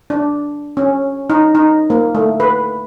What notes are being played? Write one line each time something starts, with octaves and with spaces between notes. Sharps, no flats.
D4
C#4
D#4
D#4
A#3
A3
B4